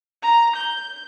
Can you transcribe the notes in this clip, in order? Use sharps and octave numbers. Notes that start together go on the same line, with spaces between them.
A#5
G6